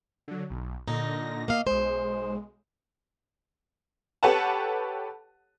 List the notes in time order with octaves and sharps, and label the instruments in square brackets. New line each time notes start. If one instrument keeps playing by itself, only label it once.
[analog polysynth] D3 F#3
B1
[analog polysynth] A#2 D3 A#6 [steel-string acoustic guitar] D#4
[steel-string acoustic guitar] A#3 D#5 F5
[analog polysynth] B1 G#3 [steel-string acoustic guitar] C5
[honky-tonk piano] G4 A4 B4 C#5 F#5 A5